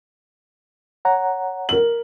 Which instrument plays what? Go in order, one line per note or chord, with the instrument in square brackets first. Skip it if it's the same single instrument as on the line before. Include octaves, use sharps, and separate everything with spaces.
[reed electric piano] C#5 F#5 A#5
[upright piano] A#4 F#7